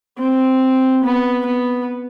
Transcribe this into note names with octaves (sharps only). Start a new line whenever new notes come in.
C4
B3
B3